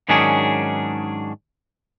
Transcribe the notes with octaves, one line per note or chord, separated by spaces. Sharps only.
G#2 D#3 F#3 C#4 D4 G#4